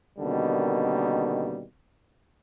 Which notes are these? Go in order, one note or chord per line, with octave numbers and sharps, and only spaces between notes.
B2 D3 D#3 G3 A#3 C#4